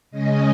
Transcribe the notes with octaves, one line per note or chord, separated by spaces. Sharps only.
C#3 G#3 C#4 D#5